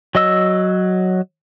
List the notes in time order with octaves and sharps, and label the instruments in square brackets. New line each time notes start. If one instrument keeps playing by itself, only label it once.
[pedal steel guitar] F#3 D#5 E6